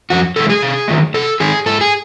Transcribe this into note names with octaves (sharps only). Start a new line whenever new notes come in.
F2 F#4
C3 E3 G#3 A4
G#4
C3
D#3 F#3 A3
C3 A4
D#3 G#3 G#4
G#2 A4
G#4